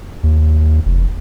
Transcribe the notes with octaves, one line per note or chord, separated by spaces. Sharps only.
D#2
F1